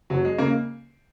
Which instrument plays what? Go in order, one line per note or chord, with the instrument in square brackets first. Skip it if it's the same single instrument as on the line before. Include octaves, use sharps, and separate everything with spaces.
[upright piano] F#1 [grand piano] F#3
[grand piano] G#3
[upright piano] C#3 [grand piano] A#3